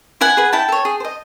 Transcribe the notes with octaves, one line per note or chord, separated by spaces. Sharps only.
E4 F#5 G#5
G#4 B4
E4 G5 A5
A4 C#5
G#4
C5
D#5